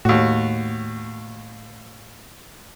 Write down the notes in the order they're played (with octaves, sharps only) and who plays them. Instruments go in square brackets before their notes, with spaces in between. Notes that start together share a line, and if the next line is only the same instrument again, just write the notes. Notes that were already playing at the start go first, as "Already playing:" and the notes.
[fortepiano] D#2 F#4 [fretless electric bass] A2